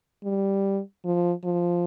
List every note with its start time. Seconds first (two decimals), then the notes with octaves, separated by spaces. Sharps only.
0.24 G3
1.04 F3
1.44 F3